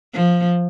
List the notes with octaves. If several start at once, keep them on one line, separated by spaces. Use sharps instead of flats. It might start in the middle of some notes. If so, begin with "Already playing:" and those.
F3